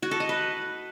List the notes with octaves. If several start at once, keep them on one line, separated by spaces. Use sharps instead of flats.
F#4
A4
D#5
B4